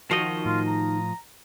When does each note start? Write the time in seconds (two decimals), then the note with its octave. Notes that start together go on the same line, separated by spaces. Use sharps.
0.11 D#3 F3 D#4 F#4 D#5
0.45 A2 F4
0.67 A#5